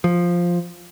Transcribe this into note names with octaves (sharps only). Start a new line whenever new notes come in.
F3